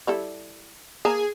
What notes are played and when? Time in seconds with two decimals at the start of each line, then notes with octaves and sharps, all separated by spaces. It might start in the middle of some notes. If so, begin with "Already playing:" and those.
0.07 G3 E4 A4
1.05 A#3 G#4 A5 A#5